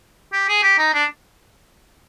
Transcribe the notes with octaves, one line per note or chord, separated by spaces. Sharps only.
G4
G#4
G4
D#4
D4